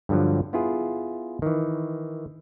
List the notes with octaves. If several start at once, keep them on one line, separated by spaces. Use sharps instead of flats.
G2 D3 F3 F#3
B3 E4 F4 G#4
D#3 E3